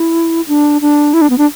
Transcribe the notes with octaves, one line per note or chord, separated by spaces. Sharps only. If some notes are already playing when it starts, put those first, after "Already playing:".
Already playing: E4
D4
D4
E4
D4
B3
D4